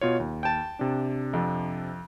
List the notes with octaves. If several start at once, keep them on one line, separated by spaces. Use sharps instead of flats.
B2 F4 C#5
D#2
G5 A5
C3 D4
F2